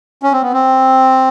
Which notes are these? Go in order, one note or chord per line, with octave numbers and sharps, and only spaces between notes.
C#4
C4
B3
C4